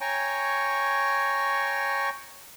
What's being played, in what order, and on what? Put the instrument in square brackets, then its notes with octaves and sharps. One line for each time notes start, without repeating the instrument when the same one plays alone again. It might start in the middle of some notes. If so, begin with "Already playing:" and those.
[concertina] C#5 G5 G#5 A#5 C#6